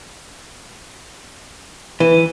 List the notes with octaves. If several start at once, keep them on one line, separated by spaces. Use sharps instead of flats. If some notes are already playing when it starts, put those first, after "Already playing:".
E3 B4 D#7